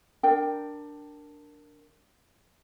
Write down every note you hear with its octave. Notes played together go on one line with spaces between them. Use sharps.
D4 A#4 G5